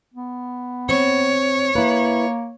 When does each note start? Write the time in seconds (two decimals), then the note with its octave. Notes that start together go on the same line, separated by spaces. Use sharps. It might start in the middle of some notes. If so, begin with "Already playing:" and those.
0.14 B3
0.89 C4 C#5
1.75 A#3 E4 B4